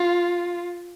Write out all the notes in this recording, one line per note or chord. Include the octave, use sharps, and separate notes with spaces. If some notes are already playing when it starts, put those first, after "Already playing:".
Already playing: F4